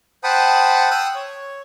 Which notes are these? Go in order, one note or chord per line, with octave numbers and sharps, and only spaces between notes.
C5 F#5 G5 A5 B5 D#6
G5 D#6 E6 F#6
C#5